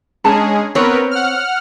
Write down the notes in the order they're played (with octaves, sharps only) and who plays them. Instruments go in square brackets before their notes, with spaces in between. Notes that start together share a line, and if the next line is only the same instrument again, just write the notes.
[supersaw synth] G#3 C#4 G#4 [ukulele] D4 A5 A#5
[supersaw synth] B3 A#4 B4 [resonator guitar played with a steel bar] C4 C#5
[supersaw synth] F#5 F6